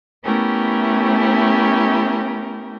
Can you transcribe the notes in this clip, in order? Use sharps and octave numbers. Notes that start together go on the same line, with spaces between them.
A3 B3 C#4 E4 G4 A#4